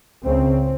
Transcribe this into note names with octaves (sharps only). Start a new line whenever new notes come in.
C#2 C#3 C4